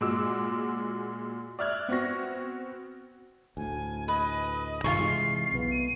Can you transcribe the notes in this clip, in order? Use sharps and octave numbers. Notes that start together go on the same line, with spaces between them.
A#2 G#3 F#4 D6 E6
D5 E5 F6 F#6 G#6
B3 C4 F#4 C#6 A#6
D2 A2 G#5
B4 D#5
G2 C3 D#3 F4 A4 C#6 C7
C3 E3 G#3
B1 B2 B3
D#7